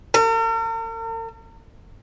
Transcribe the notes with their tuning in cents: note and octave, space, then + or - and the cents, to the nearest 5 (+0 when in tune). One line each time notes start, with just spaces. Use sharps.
A#4 -45